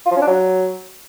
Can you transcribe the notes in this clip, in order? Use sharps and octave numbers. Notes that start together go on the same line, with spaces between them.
F4
F3
C#4
D4
F#3